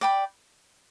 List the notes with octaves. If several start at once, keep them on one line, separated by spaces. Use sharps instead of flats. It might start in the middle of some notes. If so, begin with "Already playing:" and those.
D5 G5 B5